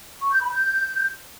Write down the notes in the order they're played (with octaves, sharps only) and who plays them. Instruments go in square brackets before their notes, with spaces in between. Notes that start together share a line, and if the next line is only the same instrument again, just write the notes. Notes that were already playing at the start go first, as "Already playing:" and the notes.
[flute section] C#6
G6
B5
G6